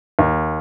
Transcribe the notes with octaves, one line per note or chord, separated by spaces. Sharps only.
D#2